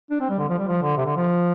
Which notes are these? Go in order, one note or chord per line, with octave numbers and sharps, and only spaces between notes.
D4
C4
G3
D3
F3
G3
F3
D3
C3
D3
F3